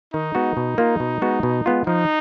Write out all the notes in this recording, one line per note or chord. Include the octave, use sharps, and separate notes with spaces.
D#3 D#4
G#3 B3 F#4
B2
A#3 F4
B2
G#3 B3 F#4
B2
G#3 B3 F4
F3 D#4